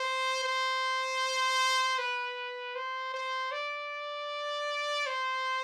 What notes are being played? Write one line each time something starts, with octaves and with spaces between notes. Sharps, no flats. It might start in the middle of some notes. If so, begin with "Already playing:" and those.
Already playing: C5
C5
B4
C5
C5
D5
C5